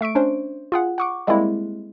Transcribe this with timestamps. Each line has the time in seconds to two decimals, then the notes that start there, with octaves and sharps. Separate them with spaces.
0.01 A3 E5 C#6 D7
0.15 C#4 D4 C5
0.72 F4 G#4 F#5
0.98 F#5 C#6 D6
1.27 G3 G#3 A#3 C4 E4